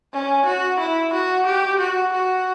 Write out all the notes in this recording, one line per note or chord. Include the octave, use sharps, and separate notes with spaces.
C#4
F#4
E4
F#4
G4
F#4
F#4